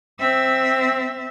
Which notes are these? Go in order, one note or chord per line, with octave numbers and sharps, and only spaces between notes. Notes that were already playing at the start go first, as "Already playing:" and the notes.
C4 E5